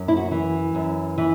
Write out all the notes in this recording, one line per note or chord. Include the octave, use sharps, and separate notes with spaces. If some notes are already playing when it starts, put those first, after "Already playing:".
Already playing: F#2
E4
F#4
E3
F#2
E3